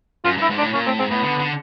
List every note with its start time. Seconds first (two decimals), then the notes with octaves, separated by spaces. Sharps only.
0.25 F#2 F4
0.37 G2
0.42 E4
0.50 G#2
0.58 D4
0.61 A2
0.74 A#2 C#4
0.86 A2 C4
0.98 G#2 C4
1.10 A2 B3
1.23 D3
1.40 D3